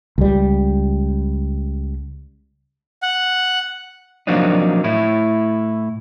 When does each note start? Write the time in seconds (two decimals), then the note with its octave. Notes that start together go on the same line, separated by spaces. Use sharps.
0.18 C#2 G3
3.03 F#5
4.27 F3 F#3 A#3 C4 D4 D#4
4.84 A2 E4